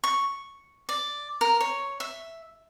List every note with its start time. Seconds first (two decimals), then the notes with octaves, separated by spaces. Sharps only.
0.04 C#6
0.89 D5
1.41 A#4
1.61 C#5
2.00 E5